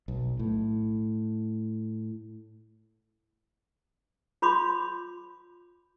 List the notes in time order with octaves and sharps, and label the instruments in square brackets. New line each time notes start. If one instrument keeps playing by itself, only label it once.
[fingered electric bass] B1
A2
[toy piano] F4 C#5 B5 C6 D6